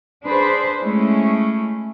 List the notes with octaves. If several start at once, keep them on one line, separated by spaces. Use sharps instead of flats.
D4 G#4 B4 C5
G#3 A3 C#4 E4